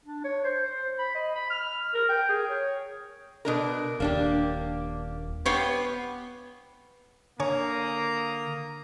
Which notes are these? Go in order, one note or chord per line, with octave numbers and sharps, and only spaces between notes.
D4
C#5
C5
C5
B5
D#5
B5
F6
A#4
G5
G#4
C#5
B2 D4 A#4
D#1 A#3 D4 G4
B3 G4 C#5 F5
D3 A#3 C#5 G#5 A#5 D#6